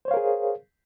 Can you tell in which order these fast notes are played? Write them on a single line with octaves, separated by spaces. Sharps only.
C5 C#5 F5 A#4 G#4